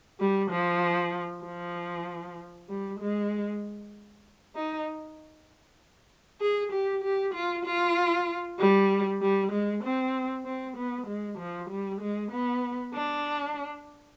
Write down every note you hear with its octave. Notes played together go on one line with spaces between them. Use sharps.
G3
F3
F3
G3
G#3
D#4
G#4
G4
G4
F4
F4
G3
G3
G#3
C4
C4
B3
G#3
F3
G3
G#3
B3
D4